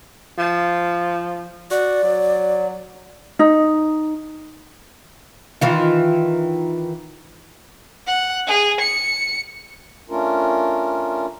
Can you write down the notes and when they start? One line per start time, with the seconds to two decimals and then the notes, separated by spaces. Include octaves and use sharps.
0.38 F3
1.71 F#4 D5
2.03 F#3
3.39 D#4
5.61 D#3 E3 F4
8.07 F#5
8.47 G#4
8.81 C#7
10.10 A3 C#4 D4 F4 A#4